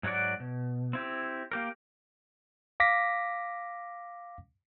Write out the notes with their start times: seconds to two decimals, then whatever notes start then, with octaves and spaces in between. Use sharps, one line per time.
0.03 G#2 F#3 C#4 F#4 D5
0.40 B2
0.93 C4 E4 G4
1.51 A#3 G4 A#4
2.80 F5 D6 A#6 B6